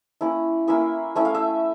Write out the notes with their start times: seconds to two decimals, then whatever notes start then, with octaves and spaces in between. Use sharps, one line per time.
0.21 A#3 C#4 E4
0.68 A#3 C#4 E4 E5
1.16 A3 C#4 E4 E5
1.25 F5
1.34 E5